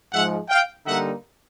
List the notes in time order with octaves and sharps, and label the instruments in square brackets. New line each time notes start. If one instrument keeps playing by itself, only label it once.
[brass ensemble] G#2 F3 G#3 E5 F#5
F5 G5
D3 G3 A#3 D#4 E5 F#5